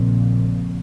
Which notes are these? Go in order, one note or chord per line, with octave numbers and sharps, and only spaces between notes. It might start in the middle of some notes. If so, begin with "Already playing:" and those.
Already playing: A#1 A#2 C#3 F3 C4